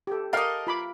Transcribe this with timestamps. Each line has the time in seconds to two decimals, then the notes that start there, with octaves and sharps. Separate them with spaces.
0.07 G4 A4
0.33 A4 A#4 D#5 F5 G5 D6 F6
0.67 F4 B5 D6